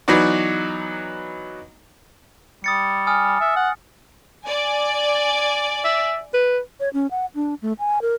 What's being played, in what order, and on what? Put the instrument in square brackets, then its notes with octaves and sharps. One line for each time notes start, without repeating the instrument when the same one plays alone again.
[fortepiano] E3 F#3 B3 D#4 F#4 D5
[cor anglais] G3 [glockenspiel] D#6 A6 C#7
[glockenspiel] G#5 D#6 F6
[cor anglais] E5
F#5
[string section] D5 G#5
[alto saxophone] E5
B4
[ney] C#5
C#4
F#5
D4
A3
G#5
A#4